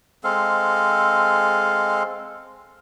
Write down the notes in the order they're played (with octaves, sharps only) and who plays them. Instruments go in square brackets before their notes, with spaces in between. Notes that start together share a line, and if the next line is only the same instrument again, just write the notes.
[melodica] G#3 C4 A4 F5